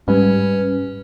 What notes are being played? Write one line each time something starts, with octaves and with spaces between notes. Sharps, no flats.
G#2 G3 C#4 B4